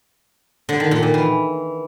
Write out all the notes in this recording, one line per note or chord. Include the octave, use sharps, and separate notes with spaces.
D3
D#3
A#2
A#2
E3